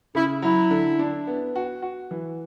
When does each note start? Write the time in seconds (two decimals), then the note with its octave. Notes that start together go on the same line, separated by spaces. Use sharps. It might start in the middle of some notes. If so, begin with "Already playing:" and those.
0.15 C#3 E4
0.42 F#3 E4
0.70 D3
0.99 D4
1.27 B3
1.56 F#4
1.82 F#4
2.11 E3